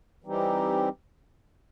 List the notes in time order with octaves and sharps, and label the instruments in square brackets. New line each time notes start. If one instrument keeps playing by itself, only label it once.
[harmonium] E3 G3 C4 D#4 G4